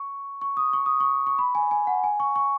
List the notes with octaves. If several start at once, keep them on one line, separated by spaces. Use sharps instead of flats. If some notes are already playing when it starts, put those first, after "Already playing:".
Already playing: C#6
C#6
D#6
C#6
D#6
C#6
C#6
B5
G#5
G#5
F#5
G#5
C#6
C#6